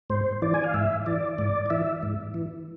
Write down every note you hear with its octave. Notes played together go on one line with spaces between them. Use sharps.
G#2 C5
E3 D5
G#5
F5
G#2 E5
E3 D5
G#2 D5
D5
E3 E5
G#2
E3